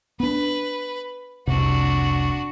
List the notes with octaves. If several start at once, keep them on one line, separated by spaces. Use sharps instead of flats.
B3 D4 B4
F1 C2 C3 D4 F#4